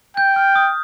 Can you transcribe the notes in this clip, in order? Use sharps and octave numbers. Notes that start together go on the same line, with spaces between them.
G5 G6
F6
D#6